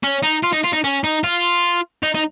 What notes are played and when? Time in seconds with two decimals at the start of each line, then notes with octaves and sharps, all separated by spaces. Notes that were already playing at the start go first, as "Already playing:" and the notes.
0.04 C#4
0.23 D#4
0.44 F4
0.53 D#4
0.64 F4
0.73 D#4
0.84 C#4
1.04 D#4
1.24 F4
2.03 D#4
2.15 D#4